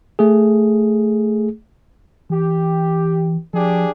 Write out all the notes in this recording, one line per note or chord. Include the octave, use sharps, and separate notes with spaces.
A3 G#4
E3 G4
F3 D4 G4 G#4